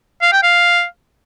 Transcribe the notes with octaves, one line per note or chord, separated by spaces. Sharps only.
F5
G5
F5